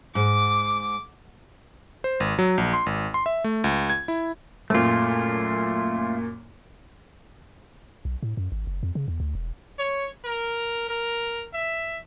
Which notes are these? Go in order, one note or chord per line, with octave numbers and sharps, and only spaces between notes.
G#2 D6
C5
G#1
F#3
A#1
C6
G#1
C6
E5
A3
C#2
G#6
E4
F#2 A#2 A3 F4
B1
A2
F#2
G#1
F#1
F2
C#3
E2
D2
E1
C#5
A#4
A#4
E5